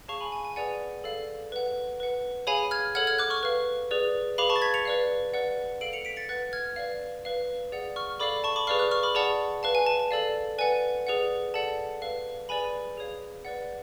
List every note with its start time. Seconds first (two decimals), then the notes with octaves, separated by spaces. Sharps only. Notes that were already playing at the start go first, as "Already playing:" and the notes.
0.08 G#4 C#5 F5 A5 C#6
0.21 G#5 B5
0.32 G#5
0.45 G#5
0.56 G#4 B4 D5 F#5 G#5
1.04 A4 D5 F5
1.52 B4 F#5
2.00 B4 F#5
2.47 G#4 C#5 F5 G#5 B5
2.71 F6 G#6
2.95 A4 C#5 F#5 F6 G#6
3.07 F6 G#6
3.18 D6 F#6
3.30 C#6 F6
3.43 B4 F5
3.91 G#4 B4 D5
4.38 G#4 B4 F5 B5 D6
4.50 A5 C#6
4.56 A6
4.62 G#6 B6
4.74 C#7 F7
4.85 B4 D5 F5
5.34 B4 D5 F#5
5.81 A4 F5 D7 F#7
5.93 C#7 F7
6.05 B6 D7
6.17 A6 C#7
6.29 B4 F#5 F#6 A6
6.53 F6 G#6
6.76 B4 D5 F5
7.25 B4 F5
7.72 G#4 D5 F#5
7.96 C#6 F6
8.20 A4 D5 F5 B5 D6
8.44 A5 C#6
8.56 B5 D6
8.67 G#4 B4 D5 F5 C#6 F6
8.79 D6 F#6
8.91 C#6 F6
9.03 B5 D6
9.15 G#4 D5 F#5 A5 C#6
9.63 B4 F5 A5
9.75 G#5
9.87 A5
10.00 A5
10.11 A4 D5 F5
10.58 B4 D5 F#5 G#5
11.07 G#4 B4 D5 F#5
11.54 A4 D5 F#5 A5
12.02 B4 F5
12.49 G#4 B4 D5 G#5 B5
12.97 G#4 C#5 F5
13.45 B4 D5 F#5